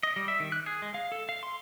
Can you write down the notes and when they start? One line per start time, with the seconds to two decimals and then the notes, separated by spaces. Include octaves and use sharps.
0.03 D#5
0.16 G3
0.28 E5
0.40 D#3
0.52 F#6
0.66 G#4
0.82 G#3
0.94 F5
1.12 A4
1.29 F5
1.43 C6